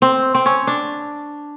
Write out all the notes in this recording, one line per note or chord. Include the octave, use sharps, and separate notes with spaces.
C4
C4
C#4
D4